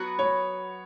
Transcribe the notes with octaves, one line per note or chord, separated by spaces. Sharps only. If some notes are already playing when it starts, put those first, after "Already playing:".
Already playing: F#3 B3 F#4 B4
C#5